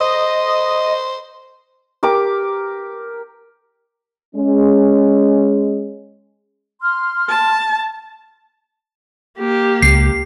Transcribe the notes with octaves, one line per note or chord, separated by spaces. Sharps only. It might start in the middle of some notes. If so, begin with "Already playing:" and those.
C5 D#5
G4 A#4 D6
G#3 C#4
C6 F6
A5
A#3 G4
C#2 C7